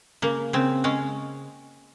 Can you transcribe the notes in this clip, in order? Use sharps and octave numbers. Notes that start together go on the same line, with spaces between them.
C#3 A#3
C#3 C4
G#3 C#4